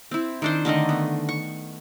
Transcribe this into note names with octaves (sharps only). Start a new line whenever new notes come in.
C4 E4
D#3 D4 C5
D3 D#3 A3 D#5
B3
C#6